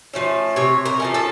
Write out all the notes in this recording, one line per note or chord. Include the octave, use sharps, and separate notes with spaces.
F3 A3 C#4
C3 C#5
A#4
F3 A3 C#4
A4